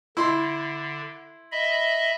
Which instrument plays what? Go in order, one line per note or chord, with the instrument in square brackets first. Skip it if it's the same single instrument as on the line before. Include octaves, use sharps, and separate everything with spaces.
[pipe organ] D3 [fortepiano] E4 C6
[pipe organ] D#5 E5 B5